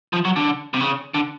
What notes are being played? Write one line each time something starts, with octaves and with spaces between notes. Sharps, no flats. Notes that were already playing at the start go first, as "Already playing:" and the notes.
F3
F#3
D3
C3
C#3
D3